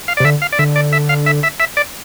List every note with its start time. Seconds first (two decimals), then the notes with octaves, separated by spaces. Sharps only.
0.08 F5
0.17 D5
0.20 C3
0.24 D3 E5
0.42 F5
0.52 D5
0.59 D3 E5
0.76 D5
0.93 E5
1.09 F5
1.26 E5
1.43 E5
1.60 E5
1.77 D5